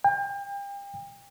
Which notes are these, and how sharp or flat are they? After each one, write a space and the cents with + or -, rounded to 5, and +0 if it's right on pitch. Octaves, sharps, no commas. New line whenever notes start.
G5 +35